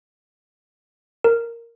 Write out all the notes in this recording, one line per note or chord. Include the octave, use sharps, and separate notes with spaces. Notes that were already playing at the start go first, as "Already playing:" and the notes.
A#4